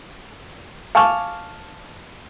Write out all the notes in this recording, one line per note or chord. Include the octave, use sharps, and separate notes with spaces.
F5 G#5 A5 C#6 D6 F6